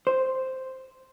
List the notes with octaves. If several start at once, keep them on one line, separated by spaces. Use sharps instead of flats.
C5